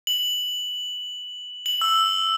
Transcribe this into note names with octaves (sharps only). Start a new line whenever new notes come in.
F#7
F#7
E6